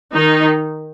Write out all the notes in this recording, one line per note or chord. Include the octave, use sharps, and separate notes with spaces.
D#3 D#4